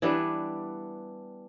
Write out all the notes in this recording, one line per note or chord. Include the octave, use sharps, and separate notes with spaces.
E3 G3 B3 D4